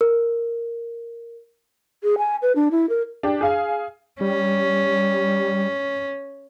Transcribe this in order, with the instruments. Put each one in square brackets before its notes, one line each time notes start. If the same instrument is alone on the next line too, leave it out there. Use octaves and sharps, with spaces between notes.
[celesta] A#4
[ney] G#4
G#5
B4
D4
E4
A#4
[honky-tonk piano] D4 G4
G#4 F5 G#5
[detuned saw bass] G3 [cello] C#4